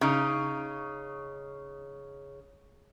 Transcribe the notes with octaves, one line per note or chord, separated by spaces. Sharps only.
C#3 D#4